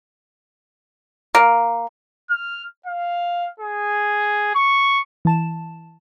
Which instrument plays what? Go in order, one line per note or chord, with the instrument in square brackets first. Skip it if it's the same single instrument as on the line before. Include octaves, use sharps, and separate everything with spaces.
[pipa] A#3
[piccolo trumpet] F6
F5
G#4
C#6
[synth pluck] E3 A5 E7